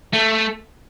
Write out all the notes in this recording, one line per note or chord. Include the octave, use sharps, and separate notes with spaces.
A3